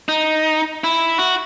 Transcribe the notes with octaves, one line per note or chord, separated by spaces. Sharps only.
D#4
E4
F#4